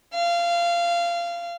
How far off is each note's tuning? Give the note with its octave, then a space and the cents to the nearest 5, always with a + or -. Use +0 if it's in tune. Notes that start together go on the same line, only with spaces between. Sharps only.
F5 -20